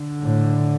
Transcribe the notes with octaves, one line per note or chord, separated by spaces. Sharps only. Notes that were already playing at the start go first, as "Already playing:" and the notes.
Already playing: D3
A2